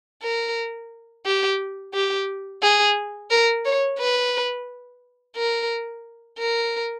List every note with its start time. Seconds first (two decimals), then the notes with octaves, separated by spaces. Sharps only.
0.23 A#4
1.26 G4
1.94 G4
2.63 G#4
3.31 A#4
3.65 C#5
3.99 B4
5.36 A#4
6.39 A#4